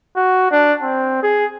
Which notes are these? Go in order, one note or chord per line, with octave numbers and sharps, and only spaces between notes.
F#4
D4
C4
G#4